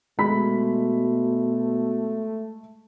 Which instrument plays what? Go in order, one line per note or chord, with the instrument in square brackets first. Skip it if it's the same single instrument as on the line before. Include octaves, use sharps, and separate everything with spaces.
[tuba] B2 [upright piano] G#3 B5 B6 [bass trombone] A3